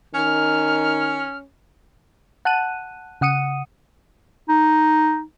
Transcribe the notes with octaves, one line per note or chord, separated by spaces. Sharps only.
D#3 C#4 F6
F#5 A5 F#6 D#7
C#3 F#5 D#6 C#7 D#7
D#4